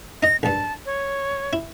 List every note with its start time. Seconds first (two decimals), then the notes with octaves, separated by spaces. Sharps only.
0.23 D#4 D#5 A#6
0.43 A#1 G2 A5
0.86 C#5
1.53 E4